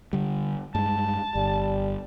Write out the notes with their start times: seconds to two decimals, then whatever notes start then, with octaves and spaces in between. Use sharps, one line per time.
0.13 D3 G3
0.75 G2 G#3 A5
1.35 G1 G3